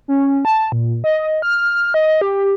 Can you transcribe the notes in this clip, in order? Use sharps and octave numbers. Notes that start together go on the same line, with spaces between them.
C#4
A5
A#2
D#5
F6
D#5
G4